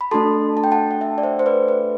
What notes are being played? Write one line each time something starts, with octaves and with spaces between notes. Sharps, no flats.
B5
A3 D4 F#4 A4 A5 C6
A5
G5
F#5 A5
F#5
E5 G5
D5
C5 E5
C5
B4 D5
B4